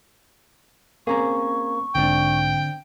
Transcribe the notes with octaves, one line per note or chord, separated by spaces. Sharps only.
A#3 C4 C#4 G#4 A#5 C#6
B1 G#2 D3 C4 D4 G5